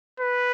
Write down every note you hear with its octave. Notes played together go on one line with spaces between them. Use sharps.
B4